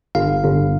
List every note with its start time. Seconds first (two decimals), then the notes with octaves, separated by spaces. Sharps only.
0.15 G1 F5
0.43 G1